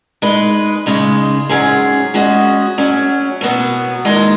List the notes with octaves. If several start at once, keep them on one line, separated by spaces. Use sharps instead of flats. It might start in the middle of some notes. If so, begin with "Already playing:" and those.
G#3 D#4 B4
C#3 G#3 D#4
G#2 F#3 C#4 G#4
G#3 C#4 F#4 D#5
F#2 F#3 C#4
B2 F#3 B3
D#2 D#3 G#3 D#4